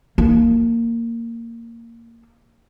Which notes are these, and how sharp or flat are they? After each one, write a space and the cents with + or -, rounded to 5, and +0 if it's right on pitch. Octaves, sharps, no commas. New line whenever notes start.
A#3 -15